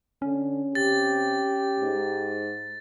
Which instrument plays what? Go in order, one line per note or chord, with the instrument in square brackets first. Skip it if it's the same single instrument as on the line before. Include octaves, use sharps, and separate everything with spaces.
[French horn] D3 [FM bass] C#4
[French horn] C3 [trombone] G4 [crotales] A6
[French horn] G#2